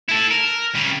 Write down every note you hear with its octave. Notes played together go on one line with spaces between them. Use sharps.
E4 A4
A#4
C#3 G3